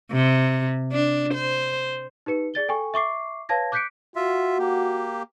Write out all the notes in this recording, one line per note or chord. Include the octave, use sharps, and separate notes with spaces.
C3
D4
C5
D#4 G4 B4 C#7
G#4 D5 A6 G7
A4 G5 G#5 C#6
E5 C#6 D6 C7
B4 C#5 F5 A5 G#6 A#6
D6 F#6 G6 B6 C#7 D7
F4 F#4 E5
A#3 G4